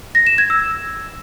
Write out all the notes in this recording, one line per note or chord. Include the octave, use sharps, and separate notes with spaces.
A#6
E7
G#6
E6